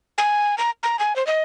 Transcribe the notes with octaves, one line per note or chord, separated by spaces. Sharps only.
G#5
A#5
A#5
G#5
C5
D#5